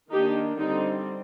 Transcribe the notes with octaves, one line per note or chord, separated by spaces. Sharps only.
D#3 A#3 D4 D#4 G4
D3 G3 C4 D#4